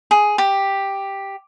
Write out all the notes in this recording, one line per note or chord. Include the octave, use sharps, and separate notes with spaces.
G#4
G4